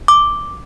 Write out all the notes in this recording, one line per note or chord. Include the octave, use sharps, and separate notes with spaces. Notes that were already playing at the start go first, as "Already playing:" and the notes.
D6